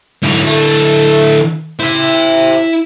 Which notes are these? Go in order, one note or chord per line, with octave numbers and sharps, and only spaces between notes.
G#2 D3 F#3 E4
A3
E4 C5 E5